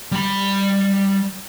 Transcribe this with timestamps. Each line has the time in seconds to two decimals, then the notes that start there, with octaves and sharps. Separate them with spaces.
0.12 G3 B5